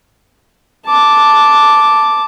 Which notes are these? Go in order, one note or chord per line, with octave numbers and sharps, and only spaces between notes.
A5 D6